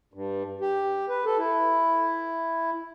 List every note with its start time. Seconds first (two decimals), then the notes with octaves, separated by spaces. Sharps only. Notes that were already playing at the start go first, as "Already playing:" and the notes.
0.14 G2
0.61 G4
1.09 B4
1.25 A4
1.38 E4